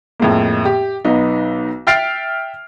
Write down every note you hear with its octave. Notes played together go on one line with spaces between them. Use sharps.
F2 A2 G#3 A#3
G4
B1 B3 D#4
E5 G5 F6 A6 C7 D7